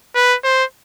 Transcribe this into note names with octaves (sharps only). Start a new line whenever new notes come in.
B4
C5